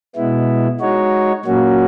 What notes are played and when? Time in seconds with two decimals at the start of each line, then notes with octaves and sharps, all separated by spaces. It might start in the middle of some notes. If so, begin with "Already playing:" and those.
0.16 B2 G#3 B3 E4
0.80 G#3 D#4 F#4 C#5
1.46 A#2 F#3 A#3 C#4 F#4